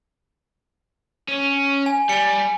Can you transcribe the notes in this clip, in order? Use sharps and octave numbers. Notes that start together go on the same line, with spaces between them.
C#4
G#5
G3 G#5 C#7